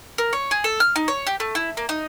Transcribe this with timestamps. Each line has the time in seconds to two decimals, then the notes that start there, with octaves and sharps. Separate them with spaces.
0.18 A#4
0.33 C#5
0.51 G#4
0.64 A4
0.80 F6
0.96 D#4
1.08 C#5
1.27 G4
1.40 A3
1.55 E4
1.77 A#3
1.89 D#4